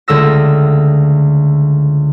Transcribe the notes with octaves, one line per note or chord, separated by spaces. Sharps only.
C#2 D3 A3 E6 A#6